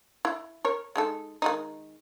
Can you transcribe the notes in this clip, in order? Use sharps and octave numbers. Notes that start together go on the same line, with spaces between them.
E4
A#4 C#5
G#3 D#4 A4
D#3 G#3 D#4